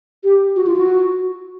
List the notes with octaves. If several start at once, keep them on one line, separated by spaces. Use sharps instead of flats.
G4
F#4
F4
F#4